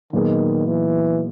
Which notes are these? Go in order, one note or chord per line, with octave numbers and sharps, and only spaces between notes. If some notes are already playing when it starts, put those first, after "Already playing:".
A#2 D#3 F#3 B3 D#4 G#4
E3